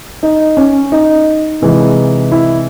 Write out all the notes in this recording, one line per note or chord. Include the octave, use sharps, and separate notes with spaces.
D#4
C#4
D#4
C3 E3 G#3
E4